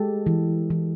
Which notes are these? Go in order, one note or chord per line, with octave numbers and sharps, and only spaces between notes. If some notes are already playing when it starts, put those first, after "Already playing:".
Already playing: G#3 G4 A4
E3
E3